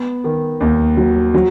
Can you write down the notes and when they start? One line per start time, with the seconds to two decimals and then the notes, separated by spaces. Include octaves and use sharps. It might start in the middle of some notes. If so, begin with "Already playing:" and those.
Already playing: B3
0.24 D#3
0.60 D#2
0.97 F#3
1.34 F#3